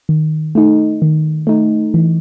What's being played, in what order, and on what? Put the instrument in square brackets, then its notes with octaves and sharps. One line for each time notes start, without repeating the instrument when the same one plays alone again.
[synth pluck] D#3
A3 D#4
D#3
A3 D#4
E3